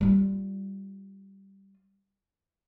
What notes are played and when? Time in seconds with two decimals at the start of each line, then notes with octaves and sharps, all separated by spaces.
0.01 G3 F4